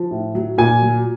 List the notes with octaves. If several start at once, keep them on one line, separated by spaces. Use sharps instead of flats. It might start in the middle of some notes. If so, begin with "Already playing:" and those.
Already playing: F3
A2
F#3
A#2 G#5
F#3